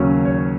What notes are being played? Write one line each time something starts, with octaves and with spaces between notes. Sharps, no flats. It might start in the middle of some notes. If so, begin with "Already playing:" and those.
Already playing: D#2 C#3 F#3 C#4
C#5